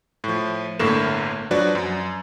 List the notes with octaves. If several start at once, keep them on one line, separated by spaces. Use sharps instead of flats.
A2 F3
G1 A2 D3 A#3 A#4 E7
F3 F#3 D4 F#4 B4 D5
F#2